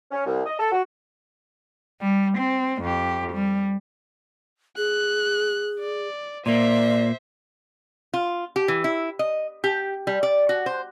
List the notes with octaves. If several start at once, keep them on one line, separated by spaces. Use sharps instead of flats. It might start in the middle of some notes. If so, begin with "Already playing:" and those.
C#4
C2
D#5
A4
F#4
G3
C4
F2 G4
G3
G#4 F#6
D5
A#2 A#3 C5 D5 E5
F4
G4
E3
E4
D#5
G4
G3
D5
F#4
C5